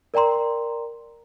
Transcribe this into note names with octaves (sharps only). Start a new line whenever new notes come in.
A#4 D5 G5 A#5 C6